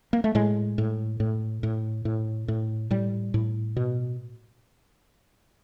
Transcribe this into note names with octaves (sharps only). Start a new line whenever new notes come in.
A#3
A3
A2 G#3
A2
A2
A2
A2
A2
A2 G3
A2
B2